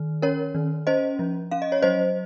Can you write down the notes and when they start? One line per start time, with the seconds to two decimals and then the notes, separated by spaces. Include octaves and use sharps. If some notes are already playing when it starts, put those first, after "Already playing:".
Already playing: D#3
0.22 C#4 A#4 C#5
0.55 D#3
0.87 C#4 C5 D#5
1.19 F3
1.51 C#4 F5
1.62 D#5
1.72 C#5
1.82 F#3 C5 D#5